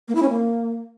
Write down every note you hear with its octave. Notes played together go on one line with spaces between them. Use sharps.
A#3
E4
C#4
A#3